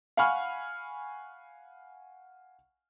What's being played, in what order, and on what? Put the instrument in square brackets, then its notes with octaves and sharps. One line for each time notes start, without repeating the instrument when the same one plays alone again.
[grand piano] F5 F#5 G#5 B5 C#6 F6